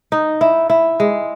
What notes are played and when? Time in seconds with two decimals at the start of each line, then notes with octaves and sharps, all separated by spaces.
0.12 D#4
0.41 E4
0.70 E4
1.00 G#3